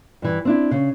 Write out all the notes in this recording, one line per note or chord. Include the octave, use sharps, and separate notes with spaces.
G2 E3
C4 D4 E4
C#3